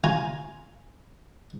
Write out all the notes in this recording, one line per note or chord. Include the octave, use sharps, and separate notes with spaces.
F4 G#5 A#5